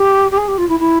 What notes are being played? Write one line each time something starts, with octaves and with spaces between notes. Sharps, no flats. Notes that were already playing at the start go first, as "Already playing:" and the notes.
Already playing: G4
G4
G#4
G4
F4
E4
E4